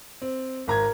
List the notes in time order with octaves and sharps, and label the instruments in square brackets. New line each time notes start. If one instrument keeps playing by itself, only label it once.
[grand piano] C4
[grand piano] G#1 A#5 G#6 [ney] A#4